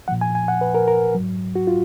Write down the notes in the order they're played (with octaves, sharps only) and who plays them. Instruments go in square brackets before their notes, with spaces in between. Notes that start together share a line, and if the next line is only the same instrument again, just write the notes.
[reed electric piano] A#2 F3 F#5
G#5
G#5
F#5
B4
A#4
A#4
G#2 F#3
F#4
F4